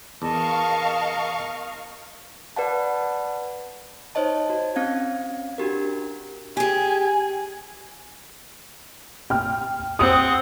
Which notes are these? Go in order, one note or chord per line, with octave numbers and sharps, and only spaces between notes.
E2 A#4 D#5 F5 A5 C#6
B4 D5 F#5 A5
D#4 C5 C#5 D#5 A5
F#4
C4 C#4 F5 G#6
D4 F#4 G4 A#4
G4 G#4 G#5
G5 F6
C4 F#5 D#6